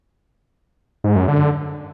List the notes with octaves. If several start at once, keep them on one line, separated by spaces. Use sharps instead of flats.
G#2
F#2
D3